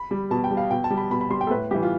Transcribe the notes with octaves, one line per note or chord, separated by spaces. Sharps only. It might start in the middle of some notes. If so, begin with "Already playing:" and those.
Already playing: B5
G3
B2 A5
G5
G3
F5
B2 G5
A5
G3
B5
B2 B5
B5
G3 C6
G5
A4
A2 B4
E3 G3 G4
F4